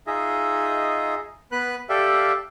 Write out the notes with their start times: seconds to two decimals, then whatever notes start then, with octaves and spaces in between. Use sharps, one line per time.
0.07 D#4 F4 G#4 D#5 E5
1.52 B3 B4 F#6
1.89 G4 A4 D5 E5 F5